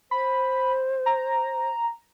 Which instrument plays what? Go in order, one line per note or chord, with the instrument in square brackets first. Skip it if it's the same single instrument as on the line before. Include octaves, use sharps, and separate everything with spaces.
[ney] C5 [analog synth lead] B5
[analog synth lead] A#5